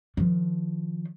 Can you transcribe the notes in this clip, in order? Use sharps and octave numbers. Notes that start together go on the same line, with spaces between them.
D#3 F3